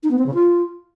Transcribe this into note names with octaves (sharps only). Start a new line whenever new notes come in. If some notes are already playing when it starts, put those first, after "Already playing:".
D#4
B3
C4
C#3
F4